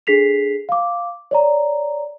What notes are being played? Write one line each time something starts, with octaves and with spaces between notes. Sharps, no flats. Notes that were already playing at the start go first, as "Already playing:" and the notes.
D4 G#4 A4 B6 C7 F7
F5 D6
C#5 D5 A#5